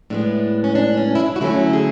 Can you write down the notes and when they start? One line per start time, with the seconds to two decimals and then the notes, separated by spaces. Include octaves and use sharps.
0.10 A2 G#3 B3 D4
0.64 C#4
0.75 D4
0.97 C#4
1.15 E4
1.20 D4
1.36 F#4
1.41 D3 F#3 A3 C#4 E4
1.73 G#4